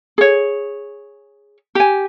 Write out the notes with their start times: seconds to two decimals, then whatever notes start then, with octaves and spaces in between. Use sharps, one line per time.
0.18 G#4 C#5
1.75 G4 G#5